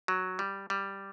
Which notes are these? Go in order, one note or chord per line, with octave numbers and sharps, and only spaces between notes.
F#3
G3
G3